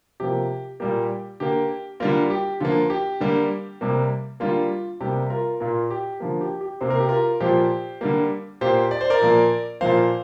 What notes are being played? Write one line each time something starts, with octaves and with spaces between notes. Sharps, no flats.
C3 F3 A#3 G4
A#2 G3 A#3 G4
D3 A#3 G4
D3 G3 A#3 F4 A#4
G4
D3 F3 A#3 F4
G4
D3 G3 A#3
C3 G3 A#3
D3 G3 A#3 F4
C3 G3 A#3 G4
F4 A#4
A#2 A#3 F4 A#4
G4
D3 F3 A#3
G4
G4
C3 A#3 C5
A#4
G4
F4 A#4
A#2 F3 A#3 G4 C5
D3 G3 A#3
A#2 A#3 G4 C5
D5
C5
A#4 D5
A#2 F3 A#3
A#2 F3 A#3 C5 F5